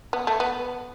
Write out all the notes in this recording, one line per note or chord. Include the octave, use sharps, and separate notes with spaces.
B3
A3
B3